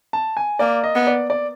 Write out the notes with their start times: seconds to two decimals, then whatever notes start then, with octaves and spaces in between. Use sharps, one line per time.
0.13 A5
0.37 G#5
0.59 A#3 D5
0.84 D#5
0.95 B3
1.07 D5
1.30 D5